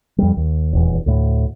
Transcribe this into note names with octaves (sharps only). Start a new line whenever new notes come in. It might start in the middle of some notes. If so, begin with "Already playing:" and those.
F2 G3
D#2
D#1 E2
D2 A2